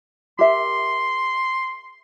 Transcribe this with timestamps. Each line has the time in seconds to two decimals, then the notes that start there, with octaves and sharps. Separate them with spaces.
0.39 G4 A#4 E5 C6